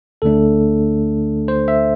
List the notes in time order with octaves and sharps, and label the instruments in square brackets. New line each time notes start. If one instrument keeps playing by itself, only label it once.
[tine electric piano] D2 D3 A3 D4 A4
C5
E5